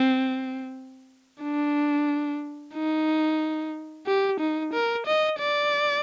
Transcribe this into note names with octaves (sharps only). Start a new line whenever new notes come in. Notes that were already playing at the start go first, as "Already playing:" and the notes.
Already playing: C4
D4
D#4
G4
D#4
A#4
D#5
D5